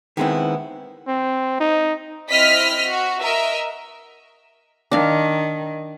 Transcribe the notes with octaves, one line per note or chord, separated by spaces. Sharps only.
D#3 G#3 B3 C4 E4
C4
D#4
C4 E4 D#5 F6 B6
F#4
A#4 D#5 E5
D#3 D4 F5